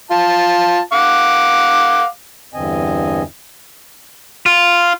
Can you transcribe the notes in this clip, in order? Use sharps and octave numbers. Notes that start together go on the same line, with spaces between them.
F4 A5
F5 F#5 D6
E2 G2 D3 C4 D#5 G#5
F4